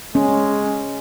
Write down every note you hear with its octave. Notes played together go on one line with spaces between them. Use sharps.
G#3 C#4